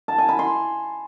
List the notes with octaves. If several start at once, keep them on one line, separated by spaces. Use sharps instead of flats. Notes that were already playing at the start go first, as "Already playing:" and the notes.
A5
G#5
B5
C6